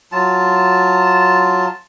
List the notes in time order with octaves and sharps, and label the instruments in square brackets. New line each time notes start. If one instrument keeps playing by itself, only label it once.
[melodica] F#3 F4 A5